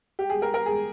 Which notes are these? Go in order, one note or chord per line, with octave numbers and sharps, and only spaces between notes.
G4
G#4
A#4
A#4
G#4